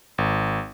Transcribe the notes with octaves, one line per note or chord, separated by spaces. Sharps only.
G#1